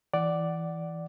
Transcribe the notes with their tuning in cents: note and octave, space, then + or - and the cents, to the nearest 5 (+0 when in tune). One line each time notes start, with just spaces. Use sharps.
E3 +0 D5 +0 F#5 +15